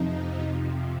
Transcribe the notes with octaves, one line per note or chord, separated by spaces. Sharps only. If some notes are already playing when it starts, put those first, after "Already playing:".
Already playing: F2 C3 F3 D#4